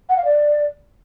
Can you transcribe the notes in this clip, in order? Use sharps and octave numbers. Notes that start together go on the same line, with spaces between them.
F#5
F5
D5